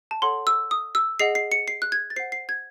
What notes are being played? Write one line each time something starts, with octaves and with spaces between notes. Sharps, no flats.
A5
A4 C#5 F#5 C6
E6
D#6
E6
G#4 D#5 F#5 C7
C7
C#7
C7
F#6
G#6
A6
C5 F#5 C7
C7
G#6